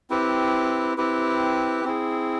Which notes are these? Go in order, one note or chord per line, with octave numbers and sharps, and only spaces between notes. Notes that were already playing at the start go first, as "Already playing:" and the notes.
C4 E4 G4 B4
C4 E4 G4 B4
C4 E4 G#4